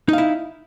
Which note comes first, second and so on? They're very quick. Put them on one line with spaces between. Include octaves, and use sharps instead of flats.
D#4 F5 E4